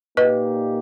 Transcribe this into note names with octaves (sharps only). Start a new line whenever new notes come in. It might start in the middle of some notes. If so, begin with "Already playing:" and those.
A#2 A#3 D#4 G4 B4 D#5